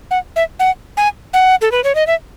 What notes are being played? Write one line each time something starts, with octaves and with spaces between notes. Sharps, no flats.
F#5
E5
F#5
G#5
F#5
A4
B4
C#5
D#5
E5